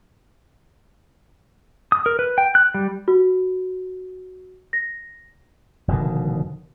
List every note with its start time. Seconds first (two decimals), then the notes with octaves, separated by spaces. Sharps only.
1.92 D#6
2.06 A#4
2.19 B4
2.38 G5
2.55 F#6
2.74 G3
3.08 F#4
4.73 A#6
5.88 F1 B2 D3 D#3